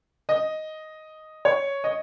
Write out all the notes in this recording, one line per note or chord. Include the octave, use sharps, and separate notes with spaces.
D#5
C#5
D#5